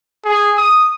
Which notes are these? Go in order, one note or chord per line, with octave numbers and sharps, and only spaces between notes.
G#4
D#6